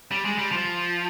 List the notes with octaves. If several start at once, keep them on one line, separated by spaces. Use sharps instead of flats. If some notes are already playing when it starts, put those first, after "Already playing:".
G3
G#3
G3
F3